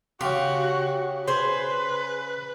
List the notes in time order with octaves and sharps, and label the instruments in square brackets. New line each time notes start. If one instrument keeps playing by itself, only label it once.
[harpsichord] C#3 C6 [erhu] F#4 [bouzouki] G4 F5
[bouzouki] G#4 C5 [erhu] B4